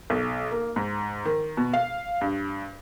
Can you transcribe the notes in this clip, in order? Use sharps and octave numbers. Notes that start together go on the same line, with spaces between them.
B1
A#3
G#2
D#3
B2
F5
G2